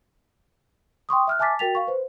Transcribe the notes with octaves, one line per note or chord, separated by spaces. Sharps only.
G5 C6 C#6 D#6
E5 F6 F#6
E5 G#5 A5 D6 A6 B6
F#4 A#4 G5 A6 B6 F7
F5 C#6
B4 C5